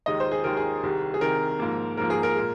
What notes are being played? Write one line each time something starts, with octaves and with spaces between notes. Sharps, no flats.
D#2 D#3 G#3 D#5
C5
G#4
D#2 D#3 G#3 A#4
G#4
C2 C3 D#3
G#4
C2 C3 D#3 A#4
G#2 F3 A#3
G#2 F3 A#3 A#4
G#4
A#4
A#2 G#3